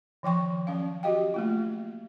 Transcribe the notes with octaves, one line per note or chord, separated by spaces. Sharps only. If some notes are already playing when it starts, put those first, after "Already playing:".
D#3 F3 G5 C#6
F#3 C#4 F5
F#4 G4 D#5 F5 G5
A3 A#3 F4